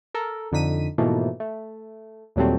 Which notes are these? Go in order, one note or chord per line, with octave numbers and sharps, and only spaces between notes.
A4 A#4
F2 D3 D#4 B6 D#7
G#2 B2 E3 F3 A3 A#3
A3
D#2 A#2 F#3 G3 A3 C4